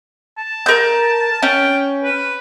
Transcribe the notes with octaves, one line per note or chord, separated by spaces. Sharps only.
A5
A#4 G6
C#4 G5
B4